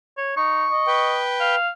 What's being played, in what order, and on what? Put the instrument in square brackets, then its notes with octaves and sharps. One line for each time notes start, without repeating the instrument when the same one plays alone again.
[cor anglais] C#5
[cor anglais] D#4 [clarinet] C#6
[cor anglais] D#5
[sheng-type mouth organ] B4 G5
[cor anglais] F5